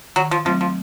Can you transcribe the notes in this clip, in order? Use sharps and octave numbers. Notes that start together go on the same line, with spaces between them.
D#3 F#3
F3
F3 F#3 A3 C4
F3